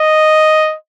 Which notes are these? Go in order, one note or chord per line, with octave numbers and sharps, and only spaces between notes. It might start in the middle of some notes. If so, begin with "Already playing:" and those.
Already playing: D#5